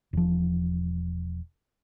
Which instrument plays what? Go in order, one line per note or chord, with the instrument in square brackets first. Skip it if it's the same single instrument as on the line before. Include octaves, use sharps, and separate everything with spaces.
[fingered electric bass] E1 F3